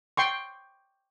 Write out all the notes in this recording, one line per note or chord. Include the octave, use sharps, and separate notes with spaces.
G5 C6 C#6